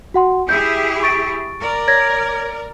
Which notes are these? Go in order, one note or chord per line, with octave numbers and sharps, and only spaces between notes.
F#4 F#5 C6
E4 G4 G#4 G6
C#6 A6 D7
A#4 D5
C#5 G#6 A#6